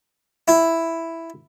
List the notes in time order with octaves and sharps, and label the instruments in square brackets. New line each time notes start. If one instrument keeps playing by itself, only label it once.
[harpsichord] E4